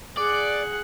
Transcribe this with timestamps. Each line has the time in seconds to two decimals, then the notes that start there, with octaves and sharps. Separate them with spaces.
0.17 G#4 D5 F#5